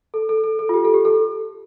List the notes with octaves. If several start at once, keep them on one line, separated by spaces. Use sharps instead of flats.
A4
A4
A4
A4
F4
G4
A4
G4
A4